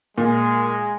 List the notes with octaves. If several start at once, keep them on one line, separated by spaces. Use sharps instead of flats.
A#2 G#3